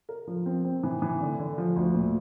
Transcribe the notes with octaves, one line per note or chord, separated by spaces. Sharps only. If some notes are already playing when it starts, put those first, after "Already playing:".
A#4
F3
C4
C4
E3
E3
D3
D3
F3
D2
A#2